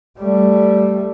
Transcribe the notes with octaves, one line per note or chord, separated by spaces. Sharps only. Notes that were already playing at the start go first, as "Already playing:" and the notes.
G3 A3